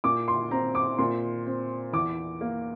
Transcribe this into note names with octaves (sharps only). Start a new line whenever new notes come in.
A#2 D6
C6
C4 A#5
D6
A#2 C6
C4
E2 D6
A#3